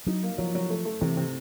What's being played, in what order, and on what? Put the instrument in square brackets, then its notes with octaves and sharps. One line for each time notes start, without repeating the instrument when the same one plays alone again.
[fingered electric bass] F#3 [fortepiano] D#4
[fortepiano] A#3
[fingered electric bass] F3 [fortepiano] F#3
[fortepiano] F#3
A3
A3
[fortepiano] C3 [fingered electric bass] E3
[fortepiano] C3